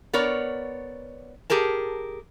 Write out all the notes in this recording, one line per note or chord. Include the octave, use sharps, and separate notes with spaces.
B3 A#4 C#5 D5
G4 G#4 A#4 A5